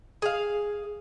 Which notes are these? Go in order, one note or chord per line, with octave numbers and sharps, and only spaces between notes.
G#4 F5